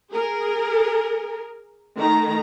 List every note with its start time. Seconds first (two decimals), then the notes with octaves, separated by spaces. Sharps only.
0.11 G#4 A#4
1.97 D#3 A3 A#5